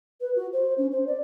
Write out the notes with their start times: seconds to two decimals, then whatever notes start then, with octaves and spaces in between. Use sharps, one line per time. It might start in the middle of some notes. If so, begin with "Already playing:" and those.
0.21 B4
0.36 F#4
0.53 C5
0.78 C#4
0.92 C5
1.07 D5